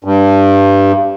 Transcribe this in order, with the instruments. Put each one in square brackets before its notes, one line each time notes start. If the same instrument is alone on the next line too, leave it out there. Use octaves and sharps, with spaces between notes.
[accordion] G2